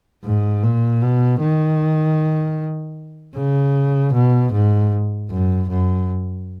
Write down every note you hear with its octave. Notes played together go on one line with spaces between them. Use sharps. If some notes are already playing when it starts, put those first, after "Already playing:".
G#2
A#2
B2
D#3
C#3
B2
G#2
F#2
F#2